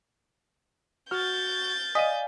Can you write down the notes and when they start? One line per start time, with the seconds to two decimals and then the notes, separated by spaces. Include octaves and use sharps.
1.11 F#4 F6 G6 A6
1.95 D5 D#5 F5 G#5 B6 D#7